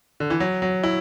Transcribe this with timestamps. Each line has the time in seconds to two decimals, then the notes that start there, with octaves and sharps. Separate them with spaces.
0.20 D3
0.30 E3
0.40 F#3
0.62 F#3
0.83 E4